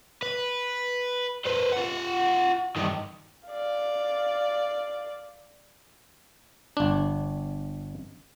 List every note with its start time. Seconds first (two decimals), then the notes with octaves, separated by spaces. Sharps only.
0.23 B4
1.46 B4 C5
1.72 F4 F#5
2.76 G2 D#3
3.48 D5 F5
6.77 G1 D4